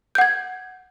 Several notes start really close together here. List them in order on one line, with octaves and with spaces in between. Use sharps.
G6 F#5 G#6